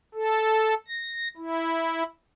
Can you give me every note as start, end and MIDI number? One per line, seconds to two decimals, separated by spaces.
0.15 0.74 69
0.88 1.28 94
1.37 2.03 64